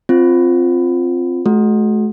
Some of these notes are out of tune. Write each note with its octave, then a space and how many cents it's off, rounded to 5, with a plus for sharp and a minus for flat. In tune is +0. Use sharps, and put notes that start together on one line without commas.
C4 +5 F4 +0
A3 -45 F#4 +0